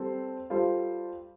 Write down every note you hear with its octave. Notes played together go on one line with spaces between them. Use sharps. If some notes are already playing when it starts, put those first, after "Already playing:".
Already playing: G3 C4 A4 C5
G3 F4 A4 C5